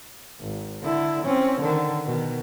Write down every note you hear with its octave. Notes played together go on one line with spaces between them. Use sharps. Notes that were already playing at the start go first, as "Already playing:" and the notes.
G#1
D3 E4
C4 C#4
D3 D#3
B2 D#3